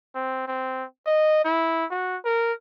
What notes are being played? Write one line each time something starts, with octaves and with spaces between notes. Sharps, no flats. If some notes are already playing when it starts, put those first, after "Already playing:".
C4
C4
D#5
E4
F#4
A#4